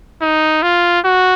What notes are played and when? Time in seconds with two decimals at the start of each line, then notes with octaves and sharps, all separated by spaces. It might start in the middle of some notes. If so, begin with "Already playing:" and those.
0.22 D#4
0.63 F4
1.05 F#4